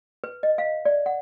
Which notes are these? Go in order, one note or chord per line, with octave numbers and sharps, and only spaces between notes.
B4
D#5
F5
D5
F#5